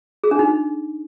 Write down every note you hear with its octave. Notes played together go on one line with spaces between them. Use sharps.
G#4
D4
D#4